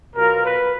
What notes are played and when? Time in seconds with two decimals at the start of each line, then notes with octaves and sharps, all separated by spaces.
0.15 B2 F#3 B3 F4 A#4
0.44 B4